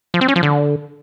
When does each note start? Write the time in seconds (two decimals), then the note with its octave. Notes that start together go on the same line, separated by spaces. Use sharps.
0.14 F3
0.21 C4
0.28 C#4
0.36 F3
0.43 D3